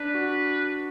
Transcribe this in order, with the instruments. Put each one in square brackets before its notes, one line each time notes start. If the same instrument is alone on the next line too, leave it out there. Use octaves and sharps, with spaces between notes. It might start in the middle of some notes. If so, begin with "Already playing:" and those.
Already playing: [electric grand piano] D4 [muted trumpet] B4
[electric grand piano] F#4